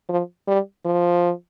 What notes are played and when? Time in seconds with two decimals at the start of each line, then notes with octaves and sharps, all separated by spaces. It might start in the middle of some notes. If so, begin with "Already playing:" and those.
0.09 F3
0.47 G3
0.85 F3